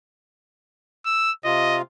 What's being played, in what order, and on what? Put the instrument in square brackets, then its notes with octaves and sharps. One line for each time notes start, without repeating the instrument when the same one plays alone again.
[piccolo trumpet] E6
[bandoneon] C3 F4 [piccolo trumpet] D#5